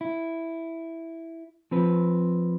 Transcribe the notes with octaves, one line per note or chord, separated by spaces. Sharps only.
E4
F3 C4 B4